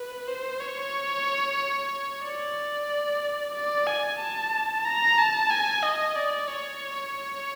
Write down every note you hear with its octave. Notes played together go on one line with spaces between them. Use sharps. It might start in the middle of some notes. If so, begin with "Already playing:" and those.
Already playing: B4
C5
C#5
D5
D5
G#5
A5
A#5
A5
G#5
D#5
D5
C#5